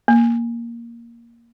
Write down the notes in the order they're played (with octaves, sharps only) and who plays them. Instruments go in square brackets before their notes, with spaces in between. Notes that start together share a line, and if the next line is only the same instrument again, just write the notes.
[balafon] A#3